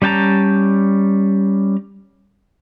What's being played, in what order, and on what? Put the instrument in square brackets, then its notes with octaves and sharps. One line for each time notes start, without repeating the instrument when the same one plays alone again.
[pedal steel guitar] G3 C#4 G5 A5 A#5